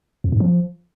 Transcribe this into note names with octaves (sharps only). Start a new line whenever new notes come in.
F2
G#2
F3